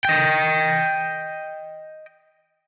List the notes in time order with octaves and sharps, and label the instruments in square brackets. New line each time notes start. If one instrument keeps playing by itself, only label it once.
[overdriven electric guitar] D#5 G5